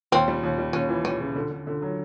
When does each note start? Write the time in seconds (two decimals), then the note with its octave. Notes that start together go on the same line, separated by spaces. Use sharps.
0.12 D#2 C4
0.28 G3
0.43 D#2
0.58 G3
0.73 D#2 C#4
0.89 E3
1.04 G3 C#4
1.20 C#3
1.36 D3
1.51 D3
1.67 D3
1.82 F#3